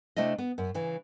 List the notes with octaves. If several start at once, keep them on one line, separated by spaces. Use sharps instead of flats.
C3 A3 D4 E4 D#5
B3
F#2
C#3 E3